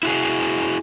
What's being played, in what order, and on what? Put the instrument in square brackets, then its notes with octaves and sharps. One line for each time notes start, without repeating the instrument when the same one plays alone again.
[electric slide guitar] E4 F#4 G#4